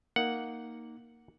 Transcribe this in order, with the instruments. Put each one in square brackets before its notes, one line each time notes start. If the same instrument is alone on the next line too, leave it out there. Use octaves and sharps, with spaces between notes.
[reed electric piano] A#3 D#4 [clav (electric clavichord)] F#5